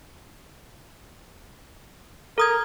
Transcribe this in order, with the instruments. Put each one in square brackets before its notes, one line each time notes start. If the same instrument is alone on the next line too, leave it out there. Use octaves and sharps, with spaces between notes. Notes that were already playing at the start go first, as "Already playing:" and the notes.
[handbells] A4 D#6 G#6 [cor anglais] A#4